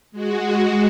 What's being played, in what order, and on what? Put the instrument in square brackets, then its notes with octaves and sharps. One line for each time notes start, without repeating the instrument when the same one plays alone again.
[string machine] G#3 F#4